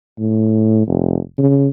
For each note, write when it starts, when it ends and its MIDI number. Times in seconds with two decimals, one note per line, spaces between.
0.18 0.85 45
0.87 1.18 29
1.38 1.68 49